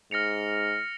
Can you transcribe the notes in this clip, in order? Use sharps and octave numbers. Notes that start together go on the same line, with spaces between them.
G#2 F6 A#6 C#7 F7